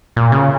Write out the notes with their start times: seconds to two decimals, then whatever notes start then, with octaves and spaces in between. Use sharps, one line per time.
0.16 A#2
0.32 C#3